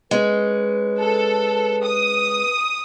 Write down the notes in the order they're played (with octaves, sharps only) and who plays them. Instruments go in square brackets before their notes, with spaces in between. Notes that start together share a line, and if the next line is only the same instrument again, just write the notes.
[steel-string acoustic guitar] G#3 C#4 [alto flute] B4
[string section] A4
D#6